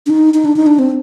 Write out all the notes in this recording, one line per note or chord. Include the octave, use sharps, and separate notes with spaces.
D4
D#4
D#4
D4
D#4
D4
C4